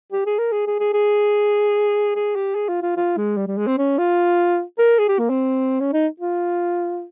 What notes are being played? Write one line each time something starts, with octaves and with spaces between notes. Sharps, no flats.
G4
G#4
A#4
G#4
G#4
G#4
G#4
G#4
G4
G#4
F4
F4
F4
G#3
G3
G3
G#3
C4
C#4
F4
A#4
G#4
G4
A#3
C4
C#4
D#4
F4